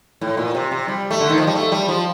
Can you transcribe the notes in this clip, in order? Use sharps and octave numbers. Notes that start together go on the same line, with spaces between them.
A2
A#2
C3
C3
G3
A3
D3
D#3
F3
G3
A3
G3
F3